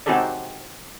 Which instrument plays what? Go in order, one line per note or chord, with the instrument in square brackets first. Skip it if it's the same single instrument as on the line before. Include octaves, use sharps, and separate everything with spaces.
[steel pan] C4 D#4 F#4 G#4 A4 D5